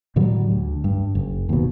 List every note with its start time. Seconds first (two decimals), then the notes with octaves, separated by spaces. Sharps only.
0.16 A2 D3 F#3 G3
0.52 D2
0.84 G2
1.15 F#1
1.49 D#2 B2